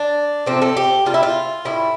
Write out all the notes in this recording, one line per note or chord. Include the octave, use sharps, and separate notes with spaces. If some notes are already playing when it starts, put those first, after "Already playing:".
Already playing: D4
C3 F3 A3 C4
A3
G4
C3 G3 F4
E4
F4
A2 E3 G3 E4